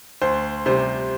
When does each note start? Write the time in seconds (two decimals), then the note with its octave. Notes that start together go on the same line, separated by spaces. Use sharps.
0.22 D2 C5
0.66 C3 G3 C5